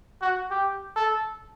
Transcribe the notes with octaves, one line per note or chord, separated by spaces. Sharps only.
F#4
G4
A4